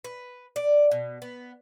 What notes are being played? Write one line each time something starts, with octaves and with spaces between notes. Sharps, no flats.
B4
D5
B2
B3